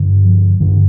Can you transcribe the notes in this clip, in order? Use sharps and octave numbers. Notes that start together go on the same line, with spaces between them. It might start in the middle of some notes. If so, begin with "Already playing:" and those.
Already playing: G2 D3
F3
G2 D3 E3